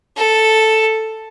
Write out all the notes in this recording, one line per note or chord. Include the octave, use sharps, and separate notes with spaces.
A4